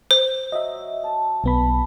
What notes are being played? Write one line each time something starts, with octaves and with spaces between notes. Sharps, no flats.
C5
F#3 D#5 E5
A5
B1 B3 A5 B5